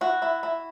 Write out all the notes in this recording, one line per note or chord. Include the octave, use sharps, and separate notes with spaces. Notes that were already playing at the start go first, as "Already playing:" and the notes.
E4 F#4
E4
E4